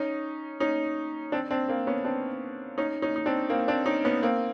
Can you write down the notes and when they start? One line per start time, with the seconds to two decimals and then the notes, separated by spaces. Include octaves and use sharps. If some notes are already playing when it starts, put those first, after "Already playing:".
Already playing: C#4 D#4
0.60 C#4 D#4
1.32 C4 D4
1.51 C4 D4
1.68 A#3 C4
1.87 B3 C#4
2.05 C4 D4
2.78 C#4 D#4
3.02 C#4 D#4
3.16 D#4
3.26 C4 D4
3.50 A#3 C4
3.68 C4 D4
3.86 C#4 D#4
4.05 B3 C#4
4.23 A#3 C4